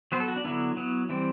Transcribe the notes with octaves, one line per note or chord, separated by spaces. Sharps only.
F#3 B3 C5
A4
F#4
D4
D3 F#3 B3 E4
F#3 B3
E3 G3 C4